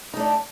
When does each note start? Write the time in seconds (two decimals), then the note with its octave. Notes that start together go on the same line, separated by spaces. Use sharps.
0.14 D#4
0.17 A3
0.20 D4